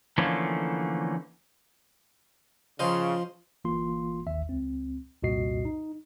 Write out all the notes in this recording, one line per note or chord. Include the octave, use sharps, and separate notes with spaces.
D3 E3 F3 A3 A#3 C#4
C#3 F3 F4 C5 D#5 C6
G1 E3 A#3 F4 C6
G#1 D#2 D#3 E5
C#2 C4
C2 F2 A#2 F#4 D#5 C7
D#4